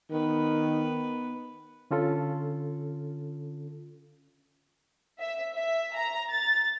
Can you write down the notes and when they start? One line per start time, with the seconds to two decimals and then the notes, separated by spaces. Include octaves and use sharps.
0.11 D#3 B3 B4
1.91 D3 C#4 F4 A4
5.20 E5
5.54 E5
5.94 A#5
6.31 A6